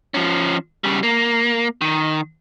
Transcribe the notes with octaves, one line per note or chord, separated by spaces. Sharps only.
F3 C#4
C#3 G3
A#3
D#3